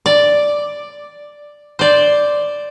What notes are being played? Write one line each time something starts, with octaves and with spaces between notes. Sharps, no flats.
D5
C5 D5